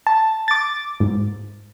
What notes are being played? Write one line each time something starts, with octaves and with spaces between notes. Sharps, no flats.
A5
D6 A6
G#2